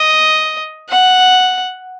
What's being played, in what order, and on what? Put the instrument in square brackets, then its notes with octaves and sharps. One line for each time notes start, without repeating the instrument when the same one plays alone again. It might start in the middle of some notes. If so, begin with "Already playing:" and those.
Already playing: [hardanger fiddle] D#5
F#5